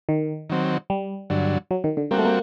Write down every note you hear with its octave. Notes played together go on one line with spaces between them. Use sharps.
D#3
D#3 F#3 C4
G3
G2 D3 F#3
F#3
D#3
D3
G3 A#3 C4 F#4
A3
A#3